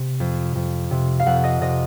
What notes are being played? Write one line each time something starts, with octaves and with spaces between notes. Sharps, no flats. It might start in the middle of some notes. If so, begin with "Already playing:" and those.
Already playing: C3
F2
F2
C3
F5
F2 F#5
D#5
C3 D#5